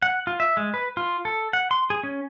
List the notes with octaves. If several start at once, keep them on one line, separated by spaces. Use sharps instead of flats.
F#5
F4
E5
G#3
B4
F4
A4
F#5
C6
G#4
C#4